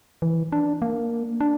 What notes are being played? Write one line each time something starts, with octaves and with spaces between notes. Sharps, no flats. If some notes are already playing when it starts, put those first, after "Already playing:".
E3
D4
A#3
D4